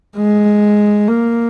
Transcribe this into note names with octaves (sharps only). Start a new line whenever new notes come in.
G#3
A#3